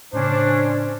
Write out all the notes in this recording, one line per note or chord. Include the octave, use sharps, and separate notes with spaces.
A2 C#3 C#4 D4 C5